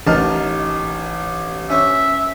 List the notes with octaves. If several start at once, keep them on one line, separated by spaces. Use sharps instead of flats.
A1 D#4 A#4 A5 F6
C#4 C5 E5